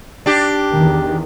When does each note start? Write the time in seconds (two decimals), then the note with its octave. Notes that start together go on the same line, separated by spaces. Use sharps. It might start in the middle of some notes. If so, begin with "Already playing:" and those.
0.26 D4 G4
0.74 E2 D#3